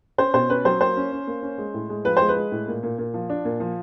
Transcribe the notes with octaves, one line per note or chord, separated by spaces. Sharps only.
C#4 C5
B2 C5
C#4 B4
F#3 C5
A#3 C5
C#4
C#4
A#3
C#4
G#3
A2
G#3
F3 B4
G#3 C5
B4
G#3
A2
A#2
A#2
A#2
F3
D4
A#2
F3